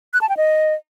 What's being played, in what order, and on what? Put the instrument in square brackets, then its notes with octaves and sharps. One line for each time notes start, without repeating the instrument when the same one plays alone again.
[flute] F#6
A5
G5
D#5